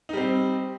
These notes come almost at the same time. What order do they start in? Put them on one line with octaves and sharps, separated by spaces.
D#4 G3 C4